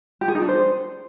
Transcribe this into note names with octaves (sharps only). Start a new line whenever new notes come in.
G4
G#4
D#4
D4
C5